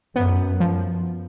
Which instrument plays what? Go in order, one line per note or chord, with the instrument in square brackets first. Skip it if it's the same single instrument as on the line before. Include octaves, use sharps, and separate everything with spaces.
[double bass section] F#2 [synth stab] B3
[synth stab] F3